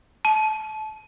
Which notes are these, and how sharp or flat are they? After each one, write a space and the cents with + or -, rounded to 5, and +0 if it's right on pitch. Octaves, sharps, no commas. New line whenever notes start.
A5 -25